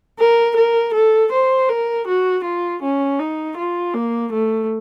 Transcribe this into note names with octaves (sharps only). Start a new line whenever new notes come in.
A#4
A#4
A4
C5
A#4
F#4
F4
C#4
D#4
F4
A#3
A3